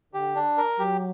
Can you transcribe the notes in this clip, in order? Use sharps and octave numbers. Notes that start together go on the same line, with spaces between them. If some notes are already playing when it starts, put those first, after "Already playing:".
D3 G4
D4
A#4
F#3 G4